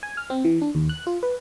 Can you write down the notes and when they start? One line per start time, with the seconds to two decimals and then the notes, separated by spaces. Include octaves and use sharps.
0.03 G#5
0.17 F6
0.30 C4
0.45 E3
0.61 D4
0.75 D#2
0.89 F#6
1.07 F4
1.23 B4